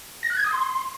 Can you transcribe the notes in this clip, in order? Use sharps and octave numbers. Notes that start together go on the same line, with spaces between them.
A#6
F#6
G#6
D#6
C6